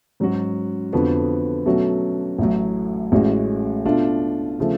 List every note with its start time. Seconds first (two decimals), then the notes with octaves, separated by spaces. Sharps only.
0.20 G#2 F#3 C#4 F#4
0.92 F2 D3 F3 B3 F#4
1.66 B2 F#3 A3 C#4 F#4
2.39 A1 A2 F#3
3.12 A1 A2 G#3 C#4 F#4
3.85 B2 A3 D4 F4
4.60 C#3 F3 A3